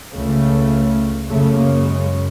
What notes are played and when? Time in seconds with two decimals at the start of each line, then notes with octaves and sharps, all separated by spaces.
0.16 C#2 C#3 A3
1.29 F#2 C#3 A3
1.57 A#3
1.86 G#3